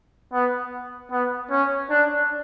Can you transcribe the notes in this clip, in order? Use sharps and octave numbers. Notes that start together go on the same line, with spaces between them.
B3
B3
C#4
D4